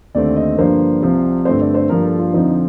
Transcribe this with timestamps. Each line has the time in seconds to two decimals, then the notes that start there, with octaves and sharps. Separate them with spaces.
0.15 D#2 D3 A3 C4 D5
0.36 D#5
0.58 G2 D3 F3 A#3 C5
1.02 C2 C3 F3
1.45 G2 D3 A3 C4 C5
1.61 D5
1.74 C5
1.90 G2 F3 A#3 A#4
2.04 A4
2.19 F4
2.33 F2 D3 F3 C4 D#4